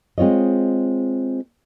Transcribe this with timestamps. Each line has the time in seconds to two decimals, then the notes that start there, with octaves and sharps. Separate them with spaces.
0.18 G#3 C4 F4 C#5 D#5